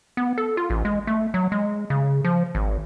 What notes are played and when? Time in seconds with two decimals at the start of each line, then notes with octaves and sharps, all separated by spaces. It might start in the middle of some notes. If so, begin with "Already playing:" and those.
0.17 B3
0.38 A4
0.57 F4
0.70 A1
0.85 G#3
1.07 A3
1.34 F#3
1.52 G#3
1.90 C#3
2.25 F3
2.55 G#1